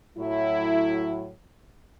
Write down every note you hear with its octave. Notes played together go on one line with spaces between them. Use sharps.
A2 F#3 E4